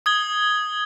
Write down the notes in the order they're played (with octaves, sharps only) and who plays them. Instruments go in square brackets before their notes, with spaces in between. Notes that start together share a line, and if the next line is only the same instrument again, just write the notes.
[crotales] D#6 G#6 G7